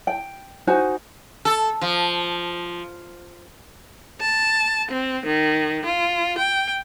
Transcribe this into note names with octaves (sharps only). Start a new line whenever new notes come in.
G5
D#4 F#4 C5 G#5
A4
F3
A5
C4
D#3
F4
G5